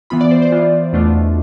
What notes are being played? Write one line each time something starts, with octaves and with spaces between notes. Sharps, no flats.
E3 B3 F4 B5
D5
C5
C5
E3 B3 F4
E2 B2 A3 D4 F4